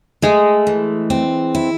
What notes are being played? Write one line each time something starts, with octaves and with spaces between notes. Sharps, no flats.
G#3 A3
E3
C4
E4